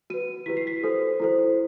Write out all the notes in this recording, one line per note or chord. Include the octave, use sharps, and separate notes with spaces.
F#4 B4 D#7
E4 G4 B4 B6
C7
B6
F#4 A4 C5
E4 A4 C5